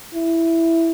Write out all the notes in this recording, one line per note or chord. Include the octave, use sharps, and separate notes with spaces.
E4